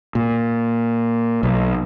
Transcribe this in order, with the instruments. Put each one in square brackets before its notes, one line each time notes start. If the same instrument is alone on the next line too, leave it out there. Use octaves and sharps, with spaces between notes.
[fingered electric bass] A#2
B1